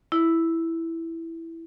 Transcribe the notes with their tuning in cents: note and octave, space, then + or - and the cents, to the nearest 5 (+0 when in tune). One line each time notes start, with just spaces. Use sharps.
E4 +0